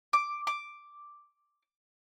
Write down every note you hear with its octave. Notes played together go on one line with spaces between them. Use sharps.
D6
D6